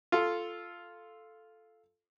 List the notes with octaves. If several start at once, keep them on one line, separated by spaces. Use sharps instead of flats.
F4 A4